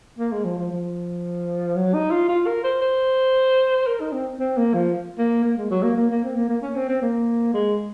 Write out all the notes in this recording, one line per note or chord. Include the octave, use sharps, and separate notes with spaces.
A#3
G#3
F3
F3
F3
F#3
D#4
F4
F4
A#4
C5
C5
A#4
D#4
C4
C4
A#3
F3
A#3
A#3
G#3
F#3
A#3
A#3
A#3
C4
A#3
A#3
C#4
C4
C4
A#3
G#3